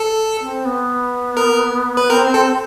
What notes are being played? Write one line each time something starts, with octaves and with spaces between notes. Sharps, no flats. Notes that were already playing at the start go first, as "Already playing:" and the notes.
Already playing: A4
C4
B3
A#4
B4
C4 A#4
A4